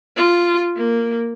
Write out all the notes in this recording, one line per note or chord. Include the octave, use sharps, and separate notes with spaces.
F4
A#3